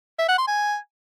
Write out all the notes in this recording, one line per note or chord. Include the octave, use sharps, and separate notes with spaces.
E5
F#5
C6
G#5